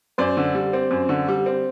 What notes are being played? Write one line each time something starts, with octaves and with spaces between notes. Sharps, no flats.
F#2 C5 D5
D3
G3
C4
F#2
D3
G3
C4